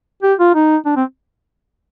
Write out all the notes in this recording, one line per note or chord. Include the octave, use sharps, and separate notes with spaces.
G4
F4
D#4
D4
C4